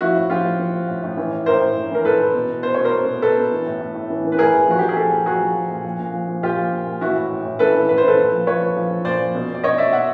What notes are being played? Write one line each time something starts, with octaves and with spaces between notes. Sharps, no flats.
F3 E4 F#4
A2
F3 F4 G4
F3
F3
F3
A2
A2
E3
A2
A2 A#4 C5
A2
A2
E3 A#4
E3 A4 B4
E3
B2
B2
B2 C5
B2 C#5
A#4 C5
B2
B2
B2 A4 B4
B2
E3
A2
A2
A2
E3
E3
B4
A2 G#4 A#4
E3
F3 F#4
F3 G4
G#4
F3 G4 A4
F3
F3 F#4 G#4
F3
F3
A#2
F3
A#2
F3
F3
A#2 F4 G4
F3
A#2
A#2
E3 E4 F#4
A2
A2
A2
E3 A4 B4
E3
A2 B4
C5
E3 A4 B4
A#2
F3
F3 B4 C#5
F3
F3
F3
A#2 C5 D5
F3
B2
B2
D5
B2 C#5 D#5
B2 D5 E5
B2 E5 F#5